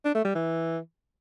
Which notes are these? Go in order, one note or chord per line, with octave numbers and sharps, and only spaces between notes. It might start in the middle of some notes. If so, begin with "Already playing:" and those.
D4
A3
G3
E3